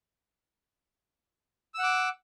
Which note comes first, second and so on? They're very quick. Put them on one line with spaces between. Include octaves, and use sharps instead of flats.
E6 F#5 D6